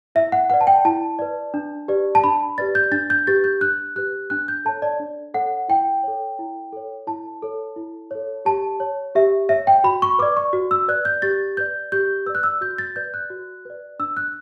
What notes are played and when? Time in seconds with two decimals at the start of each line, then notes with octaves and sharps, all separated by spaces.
0.15 E4 E5
0.32 F#5
0.50 B4 D5 F#5
0.61 A5
0.67 G5
0.85 E4 A5
1.19 B4 D5
1.54 D4
1.88 G4 B4 D5
2.15 A5
2.24 D4 B5
2.58 G4 B4 D5 A6
2.75 G6
2.92 D4 A6
3.10 G6
3.27 G4 B4 A6
3.44 G6
3.61 D4 F#6
3.96 G4 B4 F#6
4.30 D4 F#6
4.48 G6
4.65 A4 C#5 A5
4.82 D5
5.00 D4
5.34 A4 C#5 F#5
5.68 E4 G5
6.03 A4 C#5
6.39 E4
6.72 A4 C#5
7.07 E4 A5
7.42 A4 C#5
7.76 E4
8.11 A4 C#5
8.45 G4 A5
8.80 C#5
9.15 G4 E5
9.49 C#5 E5
9.67 G5
9.84 F#4 B5
10.02 C#6
10.19 B4 D5 D6
10.37 C#6
10.53 F#4
10.71 E6
10.88 B4 D5 F#6
11.05 G6
11.22 G4 A6
11.57 B4 D5 G6
11.92 G4 G6
12.26 B4 D5 E6
12.35 F#6
12.43 E6
12.61 F#4 G6
12.78 A6
12.96 B4 D5 G6
13.14 F#6
13.30 F#4
13.65 B4 D5
13.99 D4 E6
14.17 F#6